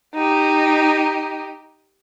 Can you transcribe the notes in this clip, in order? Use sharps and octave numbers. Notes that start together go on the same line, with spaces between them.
D#4 G4